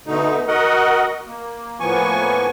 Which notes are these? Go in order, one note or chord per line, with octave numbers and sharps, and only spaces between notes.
B2 D3 A3 D#4
F#4 A#4 D#5 F#5
A#3
A2 F3 A#3 B3 G#5 C#6